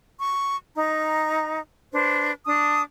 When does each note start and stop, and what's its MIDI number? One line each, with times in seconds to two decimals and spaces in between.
0.19 0.57 85
0.77 1.60 63
0.77 1.60 82
1.92 2.31 62
1.92 2.31 71
1.92 2.31 72
2.45 2.82 62
2.45 2.82 81
2.45 2.82 86
2.45 2.82 87